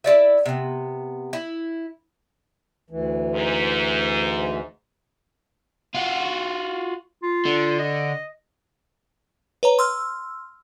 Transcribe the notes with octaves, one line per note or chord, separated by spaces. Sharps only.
E4 F4 D5 E5
C3 B3
E4
D2 E3
G#2
F4 F#4
F4
D3
D#5
B4 C#5 A#5
C6 E6 F6